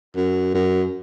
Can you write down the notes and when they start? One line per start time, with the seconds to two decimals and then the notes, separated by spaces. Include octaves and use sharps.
0.17 F#2
0.54 F#2